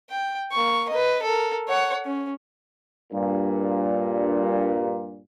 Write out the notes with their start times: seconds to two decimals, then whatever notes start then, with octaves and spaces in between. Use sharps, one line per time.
0.10 G5
0.52 A#3 C#6
0.89 B4 D#5
1.23 A4 A#4
1.68 C#5 F#5
2.05 C#4
3.13 G2 A#2